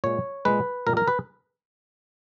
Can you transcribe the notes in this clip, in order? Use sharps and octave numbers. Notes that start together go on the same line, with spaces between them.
A#2 G#3 C#5
A#2 G#3 B4
A#2 G#3 A#4
A#4
B4